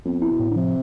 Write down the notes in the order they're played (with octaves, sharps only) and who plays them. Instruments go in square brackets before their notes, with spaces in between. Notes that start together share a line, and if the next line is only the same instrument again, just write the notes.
[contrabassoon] F2 [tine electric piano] B3
[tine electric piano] E4
[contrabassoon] B2
[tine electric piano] A2
[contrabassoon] D3
[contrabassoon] C3 [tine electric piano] F3